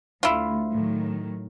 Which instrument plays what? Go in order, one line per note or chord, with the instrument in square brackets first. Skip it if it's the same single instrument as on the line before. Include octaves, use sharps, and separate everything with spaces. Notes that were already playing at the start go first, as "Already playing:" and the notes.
[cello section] D2 [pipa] E4 F4
[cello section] A2 D#3 F#3